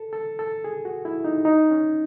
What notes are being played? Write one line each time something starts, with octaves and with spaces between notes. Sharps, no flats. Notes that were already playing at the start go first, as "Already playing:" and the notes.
Already playing: A4
A4
A4
G#4
F#4
E4
D#4
D#4
C#4